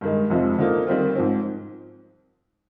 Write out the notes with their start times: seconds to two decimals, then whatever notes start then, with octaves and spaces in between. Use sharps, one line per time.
0.01 G2 D#3 G#3
0.30 F2 C3 F3 G#3
0.58 D3 F3 A#3 D#4
0.87 D#3 G3 C4 F4
1.15 G#2 F3 C4